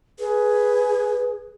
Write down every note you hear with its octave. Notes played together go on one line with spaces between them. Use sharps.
G#4 B4